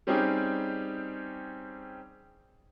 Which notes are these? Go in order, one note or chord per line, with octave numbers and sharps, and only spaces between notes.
G3 C4 C#4 D#4 G4 G#4